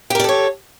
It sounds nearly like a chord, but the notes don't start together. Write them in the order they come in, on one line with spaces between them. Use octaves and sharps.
G4 A#4 D5 A4 C#5